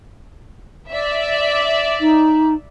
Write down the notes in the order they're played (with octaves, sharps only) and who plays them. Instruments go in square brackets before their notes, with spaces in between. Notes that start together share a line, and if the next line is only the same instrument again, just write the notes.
[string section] D5 E5
[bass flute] D#4